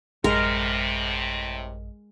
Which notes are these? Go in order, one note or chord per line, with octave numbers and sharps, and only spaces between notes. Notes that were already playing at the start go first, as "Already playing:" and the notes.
A1 F#2 A2 C3 G#3 A#4 D#5